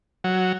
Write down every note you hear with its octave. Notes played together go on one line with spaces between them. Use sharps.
F#3